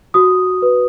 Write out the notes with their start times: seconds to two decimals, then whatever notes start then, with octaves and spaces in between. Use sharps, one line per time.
0.14 F#4 D#6
0.62 B4